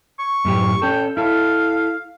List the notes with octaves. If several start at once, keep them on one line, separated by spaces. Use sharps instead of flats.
C#6
F#2 A2 G4
C#4 A4 G5
E4 A4 F5